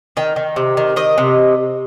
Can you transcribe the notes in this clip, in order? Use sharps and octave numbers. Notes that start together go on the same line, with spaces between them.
D#3 G5
D#3
C3
D#3
D#3 D#5
C3